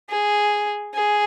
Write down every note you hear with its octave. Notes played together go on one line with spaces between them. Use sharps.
G#4
G#4